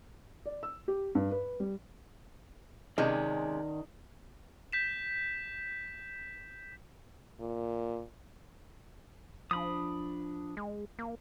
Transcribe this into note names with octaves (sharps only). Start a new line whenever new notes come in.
D5
E6
G4
G2
B4
G3
C3 D#3 G#3 C#4 D5
G6 B6 E7
A#2
F3 D4 B5 D#6
G#3
A#3